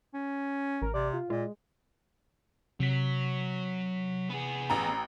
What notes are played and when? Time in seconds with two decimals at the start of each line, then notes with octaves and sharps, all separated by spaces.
0.14 C#4
0.82 A1 A#4
0.94 C3 D5
1.13 F4
1.30 A#2 G#3 F4
2.80 C3 F#3 B6
4.29 B3 G#4
4.70 A1 A#5